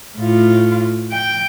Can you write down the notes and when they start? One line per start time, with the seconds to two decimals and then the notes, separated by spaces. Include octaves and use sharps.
0.17 A2 F4
1.12 G5